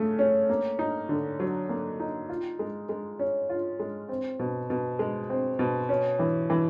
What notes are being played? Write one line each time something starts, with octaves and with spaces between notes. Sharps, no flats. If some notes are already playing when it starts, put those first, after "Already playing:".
Already playing: C#3 A3
C#4
A#3
D#4
D3
F#3
A#3
D#4
F4
G#3
G#3
C#4
F4
G#3
C4
B2
B2
G#3
C4
B2
C#4
E3
E3